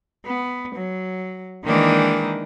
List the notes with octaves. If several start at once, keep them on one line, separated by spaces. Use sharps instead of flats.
B3
F#3
D#3 E3 G#3 A#3 D4 D#4